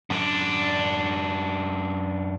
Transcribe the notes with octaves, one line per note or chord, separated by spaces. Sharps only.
F#2 D4